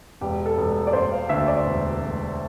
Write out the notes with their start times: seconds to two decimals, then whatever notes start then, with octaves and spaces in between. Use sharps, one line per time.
0.21 E1 G4
0.46 A4
0.57 E1
0.87 D5
0.93 E1 C5
1.12 F5
1.29 D2 E5
1.48 D5
1.66 E1
2.02 E1